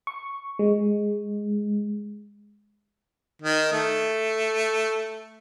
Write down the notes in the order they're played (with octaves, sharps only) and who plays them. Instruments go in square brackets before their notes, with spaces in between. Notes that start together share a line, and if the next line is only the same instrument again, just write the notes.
[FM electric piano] C#6
G#3
[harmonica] D#3
A3